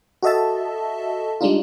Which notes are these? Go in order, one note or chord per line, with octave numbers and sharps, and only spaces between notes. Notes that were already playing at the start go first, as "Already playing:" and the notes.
F#4 A4 D#5 E5 A5
G3 G#3 D4 D#4 F4